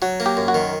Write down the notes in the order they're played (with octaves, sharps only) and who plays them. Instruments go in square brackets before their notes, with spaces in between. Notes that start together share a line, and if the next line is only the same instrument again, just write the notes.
[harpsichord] F#3 [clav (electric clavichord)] F#4
[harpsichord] A#3
[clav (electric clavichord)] G4
[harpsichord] F#2
[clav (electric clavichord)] F#4
[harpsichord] D#3